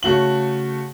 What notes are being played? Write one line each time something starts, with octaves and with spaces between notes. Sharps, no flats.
C#3 A3 F#4 F#7